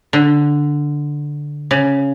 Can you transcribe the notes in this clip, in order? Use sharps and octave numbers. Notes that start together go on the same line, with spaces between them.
D3
C#3